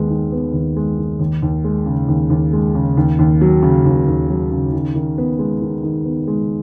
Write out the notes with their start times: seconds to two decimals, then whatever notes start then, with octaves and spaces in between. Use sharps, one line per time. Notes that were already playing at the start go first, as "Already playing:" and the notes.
Already playing: D#2 G#3 B3
0.10 D#3
0.32 B3
0.53 D#2
0.76 G#3
0.98 D#3
1.20 D#2
1.42 D#2
1.64 G#3
1.86 C#3
2.08 D#2
2.30 D#2
2.53 G#3
2.75 C#3
2.97 D#2
3.19 D#2
3.41 F#3
3.63 C#3
3.85 D#2
4.08 D#2
4.30 F#3
4.52 C#3
4.73 D#3
4.95 D#3
5.18 B3
5.39 G#3
5.61 D#3
5.83 D#3
6.05 B3
6.27 G#3